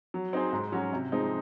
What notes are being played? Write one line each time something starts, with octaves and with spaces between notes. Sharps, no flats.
F#3
C4 D#4 G#4 C5
G#2
F#3 C#4 F#4
C3
F3 G#3 C4 D#4